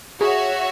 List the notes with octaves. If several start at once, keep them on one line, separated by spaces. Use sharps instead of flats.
F#4 G#4 C#5 E5